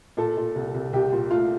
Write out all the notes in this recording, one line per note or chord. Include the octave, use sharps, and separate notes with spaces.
A#2 A4
A#2
C2
C2
C2 G4
A#2
A3 F4